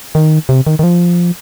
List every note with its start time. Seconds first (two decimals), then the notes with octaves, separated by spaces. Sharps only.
0.15 D#3
0.49 C3
0.67 D#3
0.79 D#3
0.83 F3